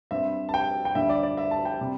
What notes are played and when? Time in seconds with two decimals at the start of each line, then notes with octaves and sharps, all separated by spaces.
0.11 G2 G3 C4 E5
0.49 A5
0.54 G5
0.85 G5
0.95 D2 D3 G3 E5
1.09 D5
1.23 D5
1.37 E5
1.51 A5
1.65 G5
1.81 C3 G3 C4